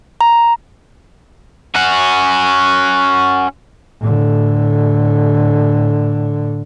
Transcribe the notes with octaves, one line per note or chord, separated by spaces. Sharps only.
A#5
C#4 F#4
A2 D3